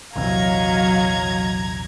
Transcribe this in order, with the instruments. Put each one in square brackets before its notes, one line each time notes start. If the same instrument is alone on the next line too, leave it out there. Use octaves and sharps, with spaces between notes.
[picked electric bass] A#1 E2 C3 [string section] F#3 [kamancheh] D#5 F5 [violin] A#5 G#6